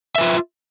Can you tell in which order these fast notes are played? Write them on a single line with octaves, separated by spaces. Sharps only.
E5 B4 F4